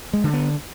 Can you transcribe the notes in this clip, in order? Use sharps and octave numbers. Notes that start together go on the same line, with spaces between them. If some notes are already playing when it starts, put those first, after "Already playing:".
G#3
D3
B3